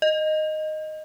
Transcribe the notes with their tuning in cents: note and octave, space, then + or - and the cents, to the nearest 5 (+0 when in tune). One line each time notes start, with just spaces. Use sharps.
D#5 -5